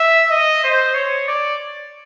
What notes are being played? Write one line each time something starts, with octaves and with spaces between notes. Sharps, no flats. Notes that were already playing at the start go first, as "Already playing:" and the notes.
Already playing: E5
D#5
C5
C#5
D5